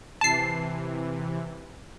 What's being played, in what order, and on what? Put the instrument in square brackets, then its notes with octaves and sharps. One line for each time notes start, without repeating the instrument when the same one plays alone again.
[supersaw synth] C3 E3 [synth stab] A5 C7